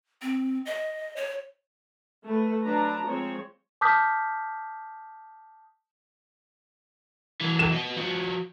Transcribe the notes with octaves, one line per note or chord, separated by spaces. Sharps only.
C4
D#5
C#5
A3 B4
F#3 D4 B4 A5 A#5
F3 G#3 C4 C#5
A5 D6 D#6 F6 G6 B6
E3 F#3
E7
B3 D#5
F3 F#4